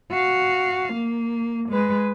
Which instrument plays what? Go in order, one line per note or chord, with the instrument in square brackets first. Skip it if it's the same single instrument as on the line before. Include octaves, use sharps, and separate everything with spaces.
[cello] F#4 F5
A#3
G#3 B4